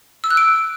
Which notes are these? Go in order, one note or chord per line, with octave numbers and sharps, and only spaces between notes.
E6
F#6
D7